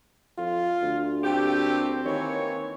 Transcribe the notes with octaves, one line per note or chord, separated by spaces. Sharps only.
F2 F4
D2
A3 A#3 C4 G4
D#3 E3 A#3 C#5